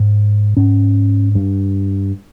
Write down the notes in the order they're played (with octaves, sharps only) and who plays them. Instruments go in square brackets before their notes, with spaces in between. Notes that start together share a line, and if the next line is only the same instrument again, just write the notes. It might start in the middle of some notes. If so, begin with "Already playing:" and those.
Already playing: [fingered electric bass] G#2
G#2 C#4
G2